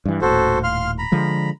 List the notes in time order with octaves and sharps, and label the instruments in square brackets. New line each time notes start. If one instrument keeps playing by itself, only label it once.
[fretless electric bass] G2 E3
[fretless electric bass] D#1 A2 [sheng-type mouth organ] F#4 A4 C5
[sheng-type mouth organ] F5 C6 F6
A#5 B5
[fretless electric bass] D3 F3 G#3